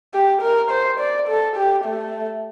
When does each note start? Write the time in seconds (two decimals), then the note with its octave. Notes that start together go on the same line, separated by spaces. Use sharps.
0.14 G4
0.42 A#4
0.70 C5
1.00 D5
1.28 A4
1.56 G4
1.85 A3